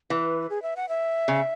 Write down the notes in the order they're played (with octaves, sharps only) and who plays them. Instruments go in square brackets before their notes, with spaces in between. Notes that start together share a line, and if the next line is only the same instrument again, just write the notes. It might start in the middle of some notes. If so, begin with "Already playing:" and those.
[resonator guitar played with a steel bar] E3 [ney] B4
[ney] G#4
E5
F#5
E5
[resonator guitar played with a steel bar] C#3